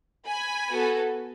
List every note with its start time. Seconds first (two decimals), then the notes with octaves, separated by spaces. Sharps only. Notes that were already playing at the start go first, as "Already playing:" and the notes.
0.27 G#5 B5
0.68 B3 F#4 A4